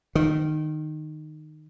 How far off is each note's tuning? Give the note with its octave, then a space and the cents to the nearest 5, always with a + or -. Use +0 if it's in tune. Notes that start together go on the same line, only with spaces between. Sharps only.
D#3 -15